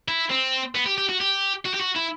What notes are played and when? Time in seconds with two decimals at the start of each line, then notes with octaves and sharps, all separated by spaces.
0.08 E4
0.30 C4
0.75 B3
0.86 G4
0.98 G4
1.09 F#4
1.20 G4
1.65 F#4
1.74 G4
1.80 F#4
1.95 E4